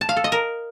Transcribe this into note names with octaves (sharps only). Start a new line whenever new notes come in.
A5
F5
A4
D#5
A#4